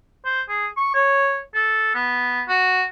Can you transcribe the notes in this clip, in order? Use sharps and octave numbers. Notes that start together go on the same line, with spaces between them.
C5
G#4
C#6
C#5
A4
B3
F#4